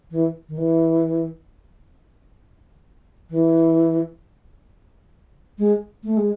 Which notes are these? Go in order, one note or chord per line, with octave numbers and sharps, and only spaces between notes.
E3
D#3
E3
E3
G#3
A3
G#3